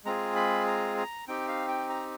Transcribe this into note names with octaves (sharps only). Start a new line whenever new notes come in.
G#3 C4 F4 G#4 A#5
B5
A#5
A#5
C4 D#4 G4 G5
F5
G5
A#5